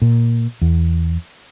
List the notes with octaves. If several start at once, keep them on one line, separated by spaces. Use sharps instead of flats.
A#2
E2